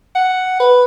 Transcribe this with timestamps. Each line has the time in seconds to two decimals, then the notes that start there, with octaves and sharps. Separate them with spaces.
0.16 F#5
0.60 B4